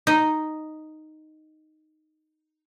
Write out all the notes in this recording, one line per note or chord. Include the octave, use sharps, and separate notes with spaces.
D#4 D#5